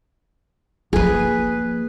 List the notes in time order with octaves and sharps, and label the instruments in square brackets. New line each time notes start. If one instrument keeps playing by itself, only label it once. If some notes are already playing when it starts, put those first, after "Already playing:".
[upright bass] F3 A#3 [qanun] G#4 B4